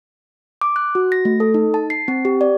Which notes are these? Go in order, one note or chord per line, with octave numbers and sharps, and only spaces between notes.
D6
F#6
F#4
A#6
A3
A4
D#4
A5
C7
C4
G4
D5